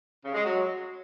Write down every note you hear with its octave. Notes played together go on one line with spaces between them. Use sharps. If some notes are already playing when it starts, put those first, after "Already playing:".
C#3
G#3
F#3